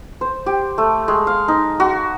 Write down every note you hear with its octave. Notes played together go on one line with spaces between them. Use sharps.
C5
G4
A3
G#3
F5
D#4
F#4